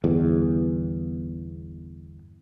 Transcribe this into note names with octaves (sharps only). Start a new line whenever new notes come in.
G1 E2